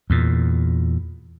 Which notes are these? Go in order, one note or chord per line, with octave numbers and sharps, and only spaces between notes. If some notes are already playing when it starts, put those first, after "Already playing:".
E2 A#2